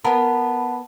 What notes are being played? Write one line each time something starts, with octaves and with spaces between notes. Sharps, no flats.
B3 A#4 F#5 A5 B5